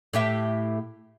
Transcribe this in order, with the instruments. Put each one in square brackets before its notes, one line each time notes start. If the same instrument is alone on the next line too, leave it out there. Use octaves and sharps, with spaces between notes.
[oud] A2 G4 E5